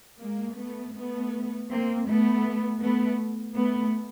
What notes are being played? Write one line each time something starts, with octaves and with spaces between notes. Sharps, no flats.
G#3 A#3
A3 B3
A3 B3
A#3 C4
A3 B3
A3 B3
A3 B3